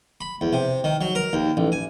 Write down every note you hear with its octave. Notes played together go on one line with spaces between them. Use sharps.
B5
E2
C3
D#3
F#3
A#4
D#2
A1
G#5